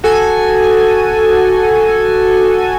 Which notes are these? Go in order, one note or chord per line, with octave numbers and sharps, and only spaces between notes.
F#4 A4 G#5